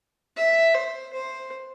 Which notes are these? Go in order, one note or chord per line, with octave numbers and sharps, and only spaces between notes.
E5
C5
C5